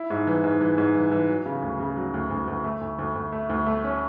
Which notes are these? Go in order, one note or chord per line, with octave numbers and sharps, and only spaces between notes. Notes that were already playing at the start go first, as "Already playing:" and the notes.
Already playing: E4
G#2
E3
G#2
E3
G#2
E3
E3
F#3
C#3
D2
C#3
F#3
D2
D2
D2
A3
D2
D2
D2
A3
D2
A3
C#4